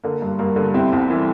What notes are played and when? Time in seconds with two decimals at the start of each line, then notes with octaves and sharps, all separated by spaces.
0.03 D3 A#3
0.22 G2
0.39 G2 A#3
0.56 D3
0.74 C3 C4 E4
0.93 C2
1.10 E3